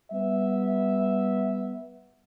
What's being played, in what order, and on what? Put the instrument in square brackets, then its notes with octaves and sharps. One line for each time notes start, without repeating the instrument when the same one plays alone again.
[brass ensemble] G3 B3 E5